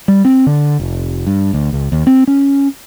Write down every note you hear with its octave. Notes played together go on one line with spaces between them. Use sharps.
G3
C4
D3
F1
G2
D2
C#2
D#2
C4
C#4